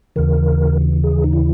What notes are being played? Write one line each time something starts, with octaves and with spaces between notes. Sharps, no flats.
D#2 C#3 E3 A#4
G#4
D#4
E4